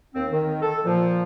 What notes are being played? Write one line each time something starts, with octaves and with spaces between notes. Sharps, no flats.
D#2 C4
D#3
A4
A#2 F3